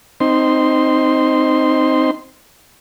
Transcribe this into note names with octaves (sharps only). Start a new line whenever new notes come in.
C4 D#4 C6